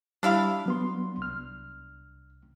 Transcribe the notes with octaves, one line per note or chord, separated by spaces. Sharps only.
G3 D4 E4 F5
F#3 B3 C6
C2 F6